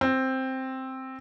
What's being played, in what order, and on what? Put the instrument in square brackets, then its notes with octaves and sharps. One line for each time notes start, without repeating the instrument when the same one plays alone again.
[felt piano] C4